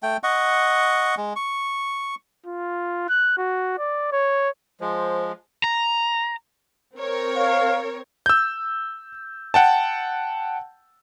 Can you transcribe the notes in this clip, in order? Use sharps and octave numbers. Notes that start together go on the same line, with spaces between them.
A3 G5
D#5 F#5 C#6
G#3
C#6
F4
F#6
F#4
D5
C#5
F3 G#3 C5
A#5
C4 A#4 C#5
F5
E6 G6
F#5 G5 A5